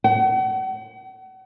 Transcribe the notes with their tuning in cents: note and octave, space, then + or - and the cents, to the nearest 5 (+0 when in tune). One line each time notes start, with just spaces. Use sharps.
F#5 +40